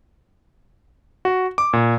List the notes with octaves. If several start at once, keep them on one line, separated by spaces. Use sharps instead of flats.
F#4
D6
A#2